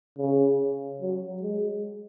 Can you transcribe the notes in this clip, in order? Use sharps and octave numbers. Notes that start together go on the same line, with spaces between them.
C#3
F#3
G#3